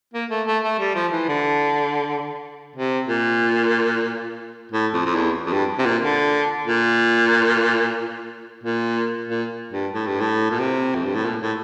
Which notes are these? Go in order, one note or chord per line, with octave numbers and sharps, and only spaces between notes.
A#3
A3
A3
A3
G3
F3
E3
D3
C3
A#2
A2
F2
F2
E2
F2
G2
C3
A#2
D3
A#2
A#2
A#2
G2
A2
G2
A2
A#2
C3
F2
G2
A2
A#2
A2